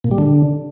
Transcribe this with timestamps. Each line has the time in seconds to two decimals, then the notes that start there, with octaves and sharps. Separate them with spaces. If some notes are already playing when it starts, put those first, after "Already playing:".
0.04 A#2
0.11 G3
0.18 D3